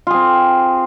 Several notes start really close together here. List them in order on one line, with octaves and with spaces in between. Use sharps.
F4 G#4 C4